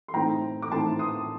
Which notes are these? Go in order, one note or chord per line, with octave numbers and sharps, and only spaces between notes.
C6
A2 A3 C4 D#4 G5 A#5
D6
A2 A3 C4 D#4 A5 C6
C6 D#6